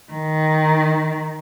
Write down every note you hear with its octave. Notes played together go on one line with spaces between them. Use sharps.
D#3